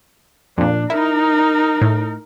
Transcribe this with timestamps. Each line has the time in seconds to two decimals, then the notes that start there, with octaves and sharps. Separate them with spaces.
0.58 F2 A#2 D4
0.90 D#4 E4 A#4
1.81 A2